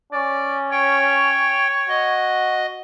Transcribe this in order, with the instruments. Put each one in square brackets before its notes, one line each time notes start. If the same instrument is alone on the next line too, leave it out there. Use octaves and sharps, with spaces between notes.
[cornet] C#4 [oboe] D5
[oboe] C#5 [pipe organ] G5
[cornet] F#4 [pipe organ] D#5